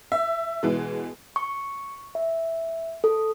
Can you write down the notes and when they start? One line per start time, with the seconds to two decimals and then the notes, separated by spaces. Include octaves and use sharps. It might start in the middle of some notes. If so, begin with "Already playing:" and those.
0.12 E5
0.63 B2 E3 G#3
1.36 C#6
2.15 E5
3.04 A4